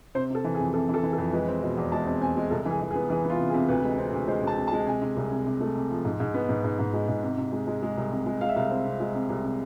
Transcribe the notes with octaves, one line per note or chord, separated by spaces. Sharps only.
C3 C5
C3 A4
E3
G#4
F2
C3 A4
E3
A4
E3
A4
F2
G#3 B4
C4
B2
E2
G#3 A5
C4
C4 G#5
G#3
C2 A4
E3
G#4
E3
G#4
B3
E3 G#4
B3 F4
C3
G#4
C3
D2 B4
G#3
C4
D2
G#3 C5
D2 A5
C3
A5
G#3
C3 G#5
C3
C2
C3
C3
A3
C3
F3
G#2
G#2
B3
G#2
G#2
G#2
G#3
G#2
C3
C3
G#3
G#3
G#3
C2
C3
G#3
G#3 F5
E5
C2 F5
C4
C3
G#3
C3
C2
C3